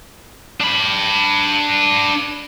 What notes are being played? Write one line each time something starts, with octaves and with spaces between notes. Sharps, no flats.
D4 B5